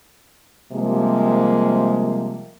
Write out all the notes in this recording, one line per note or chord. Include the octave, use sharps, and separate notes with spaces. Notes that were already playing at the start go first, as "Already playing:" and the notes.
C3 F3 G3 G#3 A#3